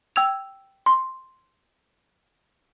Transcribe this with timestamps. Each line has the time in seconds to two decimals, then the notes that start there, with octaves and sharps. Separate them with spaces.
0.16 G5 E6 G#6 F7
0.86 C6